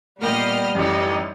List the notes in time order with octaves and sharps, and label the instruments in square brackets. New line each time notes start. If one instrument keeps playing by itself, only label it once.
[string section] A#2 D#5 F6 [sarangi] G3 [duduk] B3 [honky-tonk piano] A#4 G5
[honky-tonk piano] A1 F#2 [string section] E3 D#4 [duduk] G4